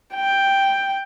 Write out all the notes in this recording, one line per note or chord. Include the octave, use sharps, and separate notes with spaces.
G5